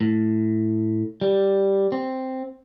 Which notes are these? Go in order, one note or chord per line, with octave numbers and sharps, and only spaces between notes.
A2
G3
C4